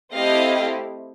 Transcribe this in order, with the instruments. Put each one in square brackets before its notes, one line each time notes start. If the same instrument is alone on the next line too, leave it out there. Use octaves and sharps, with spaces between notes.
[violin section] A3 C4 E4 G4 D#5 F5